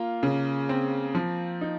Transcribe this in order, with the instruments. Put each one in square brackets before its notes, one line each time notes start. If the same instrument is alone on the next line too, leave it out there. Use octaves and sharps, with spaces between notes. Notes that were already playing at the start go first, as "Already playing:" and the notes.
Already playing: [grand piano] A#3 [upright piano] F4
[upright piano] C#3
C4
F3
D#4